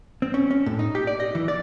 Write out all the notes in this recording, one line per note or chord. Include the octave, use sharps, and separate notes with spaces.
C4
C#4
C#4
A2
D#4
G4
D5
D#5
E3
D5